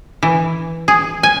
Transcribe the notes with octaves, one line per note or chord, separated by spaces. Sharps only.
E3
G#4
G#5